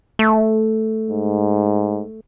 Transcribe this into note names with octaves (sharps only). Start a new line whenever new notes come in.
A3
G#2